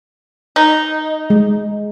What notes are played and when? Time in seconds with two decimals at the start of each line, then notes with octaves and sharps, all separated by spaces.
0.56 D#4
1.30 G#3